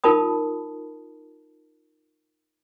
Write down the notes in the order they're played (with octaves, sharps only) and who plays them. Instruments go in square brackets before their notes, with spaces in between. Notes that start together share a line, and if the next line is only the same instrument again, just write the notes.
[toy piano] D#4 F4 A#4 A5 B5 D#6